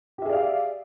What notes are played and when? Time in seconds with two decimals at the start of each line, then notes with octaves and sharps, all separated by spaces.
0.18 G4
0.22 E5
0.25 G#4
0.29 D5
0.33 F5